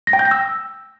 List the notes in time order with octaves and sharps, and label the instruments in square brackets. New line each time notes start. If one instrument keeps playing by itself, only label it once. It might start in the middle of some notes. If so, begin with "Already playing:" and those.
[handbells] A#6
G5
G6
A#6
E6